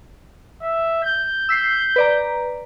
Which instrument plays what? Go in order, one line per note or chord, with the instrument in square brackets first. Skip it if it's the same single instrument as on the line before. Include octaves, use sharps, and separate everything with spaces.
[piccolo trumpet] E5
G6
[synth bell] E6 B6 C7
B4 D5 A#5